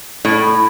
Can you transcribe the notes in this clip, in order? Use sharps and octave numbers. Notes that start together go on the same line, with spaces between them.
A2